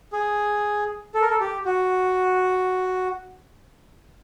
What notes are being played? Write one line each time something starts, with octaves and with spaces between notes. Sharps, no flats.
G#4
A4
A#4
A4
G4
F#4